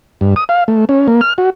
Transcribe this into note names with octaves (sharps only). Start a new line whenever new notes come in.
G2
D#6
F5
A3
C#4
A#3
F6
F#4